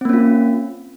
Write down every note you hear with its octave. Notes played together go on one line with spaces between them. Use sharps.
A#3 C4 C#4 F4